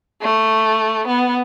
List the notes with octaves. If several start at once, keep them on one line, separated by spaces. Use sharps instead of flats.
A3
B3